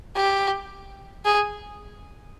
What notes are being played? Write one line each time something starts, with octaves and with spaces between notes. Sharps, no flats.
G4
G#4